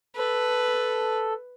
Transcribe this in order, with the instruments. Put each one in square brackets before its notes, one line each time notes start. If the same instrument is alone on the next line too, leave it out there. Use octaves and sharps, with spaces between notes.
[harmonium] A4 [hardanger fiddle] B4